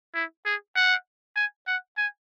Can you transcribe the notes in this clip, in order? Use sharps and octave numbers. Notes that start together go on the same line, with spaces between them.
E4
G#4
F#5
G#5
F#5
G#5